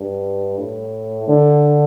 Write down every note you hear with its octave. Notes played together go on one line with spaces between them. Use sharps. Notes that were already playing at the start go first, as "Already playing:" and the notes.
Already playing: G2
A2
D3